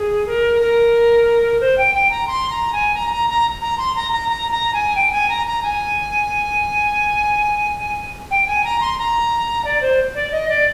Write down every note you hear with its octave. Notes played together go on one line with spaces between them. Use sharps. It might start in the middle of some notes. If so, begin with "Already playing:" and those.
Already playing: G#4
A#4
A#4
C5
G5
G5
A#5
C6
A#5
G#5
A#5
A#5
A#5
A#5
C6
A#5
A#5
A#5
A#5
G#5
G5
G#5
A#5
A#5
G#5
G5
G#5
A#5
C6
A#5
D5
C5
D5
D#5
D5